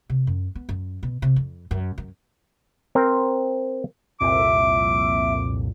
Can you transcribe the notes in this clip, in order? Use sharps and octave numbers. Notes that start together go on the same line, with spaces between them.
C3
F#2
B3
F#2
B2
C3
F2
F#2
F#2
C4 A#4 C5
C2 F2 A#2 E5 D6